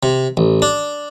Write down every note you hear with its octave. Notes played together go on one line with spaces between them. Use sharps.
C3
A1
D4